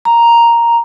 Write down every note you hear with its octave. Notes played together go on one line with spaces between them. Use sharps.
A#5